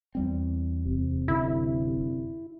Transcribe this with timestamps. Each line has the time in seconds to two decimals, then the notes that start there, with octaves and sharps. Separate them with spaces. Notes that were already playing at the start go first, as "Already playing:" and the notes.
0.15 E2 G3 C4
0.86 D1 C3
1.28 F#2 D3 E4